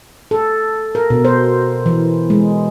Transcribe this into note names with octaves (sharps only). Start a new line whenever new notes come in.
A4
A#4
B2
C5
E3
G#3